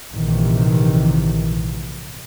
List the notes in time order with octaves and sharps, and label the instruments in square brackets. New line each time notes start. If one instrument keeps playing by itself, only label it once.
[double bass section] A#1 G#2 C3 D#3 E3